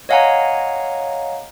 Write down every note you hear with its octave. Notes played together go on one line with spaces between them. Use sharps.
C#5 D#5 F5 F#5 G#5 A#5